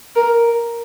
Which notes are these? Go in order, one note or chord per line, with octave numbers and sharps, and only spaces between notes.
A#4